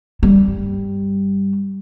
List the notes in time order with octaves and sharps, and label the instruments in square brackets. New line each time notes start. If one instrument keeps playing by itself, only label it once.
[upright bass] G2 G3